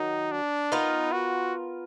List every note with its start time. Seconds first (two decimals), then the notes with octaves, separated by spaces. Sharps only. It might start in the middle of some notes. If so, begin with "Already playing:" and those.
Already playing: D#3 F#3 D#4
0.32 D4
0.72 B3 D#4 F4 A#4
1.12 F#4